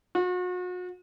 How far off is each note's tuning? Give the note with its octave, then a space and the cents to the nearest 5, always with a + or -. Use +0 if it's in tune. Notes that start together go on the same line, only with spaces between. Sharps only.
F#4 -40